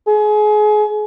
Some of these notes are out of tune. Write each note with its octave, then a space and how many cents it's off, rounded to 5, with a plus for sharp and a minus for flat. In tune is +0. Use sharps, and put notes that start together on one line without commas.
G#4 +30